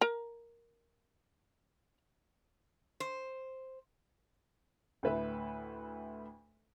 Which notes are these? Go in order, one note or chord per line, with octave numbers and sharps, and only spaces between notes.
A#4 A#5
C5
D2 A2 B4 E5